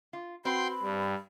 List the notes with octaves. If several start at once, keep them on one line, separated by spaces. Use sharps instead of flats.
F4
C4 F#4 B4 G5 B5 C6 G6
G2 G3